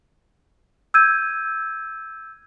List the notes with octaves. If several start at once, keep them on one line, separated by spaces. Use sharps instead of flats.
E6 G6 G#6 D#7